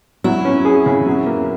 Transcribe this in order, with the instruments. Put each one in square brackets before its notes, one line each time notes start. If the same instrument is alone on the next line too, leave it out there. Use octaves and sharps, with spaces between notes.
[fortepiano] F#3 [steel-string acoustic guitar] E4
[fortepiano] C#4
G#4
C#3
F#3
A#3